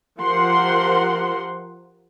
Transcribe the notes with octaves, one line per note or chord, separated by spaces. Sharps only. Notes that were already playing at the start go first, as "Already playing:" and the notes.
F3 G4 A#4 C5 F#5 C6